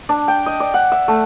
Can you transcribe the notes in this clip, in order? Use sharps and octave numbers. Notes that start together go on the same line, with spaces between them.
D4
G5
D#5
D5
F#5
E5
A3